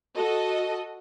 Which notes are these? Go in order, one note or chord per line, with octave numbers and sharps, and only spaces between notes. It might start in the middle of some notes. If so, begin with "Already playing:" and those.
F#4 A4 D#5